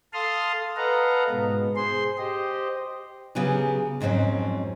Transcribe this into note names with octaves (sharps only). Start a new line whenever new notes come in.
A4 F5 A5 C6 D#6 F6
A4 B4 D#5 F5 F#5 A#5
G#2 B2 B3
G#4 C5 C6
G4 C5 D#5
C#3 F#3 B3 G4 G#4
F2 G#2 F#3 C4 C#4